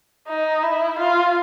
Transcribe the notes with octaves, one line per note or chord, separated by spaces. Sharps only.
D#4
E4
F4